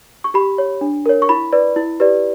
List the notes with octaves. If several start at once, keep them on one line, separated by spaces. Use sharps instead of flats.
C#6
G4 B5
C#5
D4
A#4 C#5
C#6
E4 B5
B4 D5
E4
G4 B4 D5